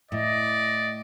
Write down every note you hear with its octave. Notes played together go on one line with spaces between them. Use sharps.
A2 D5 D#5